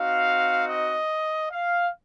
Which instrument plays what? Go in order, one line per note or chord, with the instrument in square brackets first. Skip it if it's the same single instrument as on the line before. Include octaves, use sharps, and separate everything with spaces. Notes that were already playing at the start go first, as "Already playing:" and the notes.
Already playing: [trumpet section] C4 D#4 F#4 F5
D#5
F5